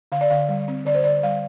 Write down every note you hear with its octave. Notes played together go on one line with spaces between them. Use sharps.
D3 F5
D5
D3 F5
G3
C4
D3 D5
C5
D3 D5
G3 F5